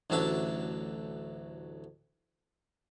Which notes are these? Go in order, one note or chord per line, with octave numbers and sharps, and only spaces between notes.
A1 D2 F#3 D4 E5 A5